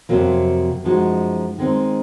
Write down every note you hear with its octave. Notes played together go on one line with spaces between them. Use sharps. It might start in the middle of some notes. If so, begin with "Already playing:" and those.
F2 C3 F#3 A#3
F#2 F3 G#3 D#4 F#4
D#3 G#3 C4 D#4